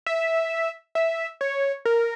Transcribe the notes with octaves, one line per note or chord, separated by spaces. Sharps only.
E5
E5
C#5
A#4